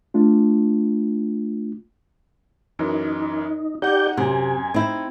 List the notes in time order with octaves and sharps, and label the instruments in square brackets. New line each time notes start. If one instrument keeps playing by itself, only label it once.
[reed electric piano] A3 D4 F4
[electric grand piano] F#2 E3 A#4 [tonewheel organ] D#4
[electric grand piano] D#4 F#5 [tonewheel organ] G4 D5 G6
[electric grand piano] F#2 [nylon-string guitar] C3 [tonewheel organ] G#5
[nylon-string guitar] C4 E4 [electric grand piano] D#4